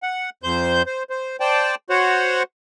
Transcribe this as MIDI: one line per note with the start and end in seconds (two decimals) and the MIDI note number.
0.03 0.30 78
0.43 0.82 41
0.43 0.82 72
0.43 0.82 91
0.86 1.03 72
1.10 1.36 72
1.40 1.75 72
1.40 1.75 74
1.40 1.75 79
1.40 1.75 81
1.90 2.43 66
1.90 2.43 72
1.90 2.43 73
1.90 2.43 78